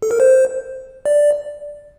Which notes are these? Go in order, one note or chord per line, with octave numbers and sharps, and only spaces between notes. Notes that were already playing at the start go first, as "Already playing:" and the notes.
A4
A#4
C5
D5